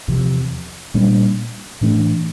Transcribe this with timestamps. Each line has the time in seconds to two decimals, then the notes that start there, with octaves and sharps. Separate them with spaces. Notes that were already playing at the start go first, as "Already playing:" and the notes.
0.08 E2 C3 F3
0.94 A#2 G3 A#3 D4
1.81 A2 E3 A3 D4